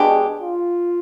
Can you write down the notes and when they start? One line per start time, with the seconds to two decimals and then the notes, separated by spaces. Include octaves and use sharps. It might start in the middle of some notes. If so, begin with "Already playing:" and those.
Already playing: B2 G#3 D4 G4 G#4
0.41 F4